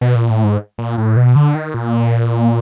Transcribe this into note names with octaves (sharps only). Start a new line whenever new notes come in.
B2
A#2
A2
G#2
A#2
A2
B2
D3
D#3
A#2